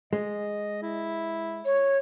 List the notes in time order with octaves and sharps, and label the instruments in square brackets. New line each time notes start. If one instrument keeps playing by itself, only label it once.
[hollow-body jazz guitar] G#3 [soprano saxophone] D#5
[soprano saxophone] E4
[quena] C#5